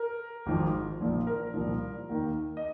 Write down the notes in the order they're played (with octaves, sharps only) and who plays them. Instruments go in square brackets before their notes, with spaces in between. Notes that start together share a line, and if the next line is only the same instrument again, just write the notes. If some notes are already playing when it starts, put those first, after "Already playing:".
Already playing: [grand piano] A#4
G#1 G#2 F3
A#1 A#2 F3
A#4
C2 A#2 F3
D#2 D#3
D#5